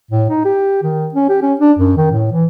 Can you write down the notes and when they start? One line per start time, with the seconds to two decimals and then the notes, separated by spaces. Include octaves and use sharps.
0.11 A2
0.29 D#4
0.44 G4
0.83 D#3
1.14 C#4
1.29 G4
1.42 C#4
1.60 D4
1.79 F#2
1.97 D#3
2.11 A2
2.32 E3